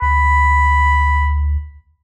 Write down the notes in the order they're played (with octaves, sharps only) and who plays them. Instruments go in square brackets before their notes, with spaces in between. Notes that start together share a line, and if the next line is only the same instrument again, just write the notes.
[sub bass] D2 [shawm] B5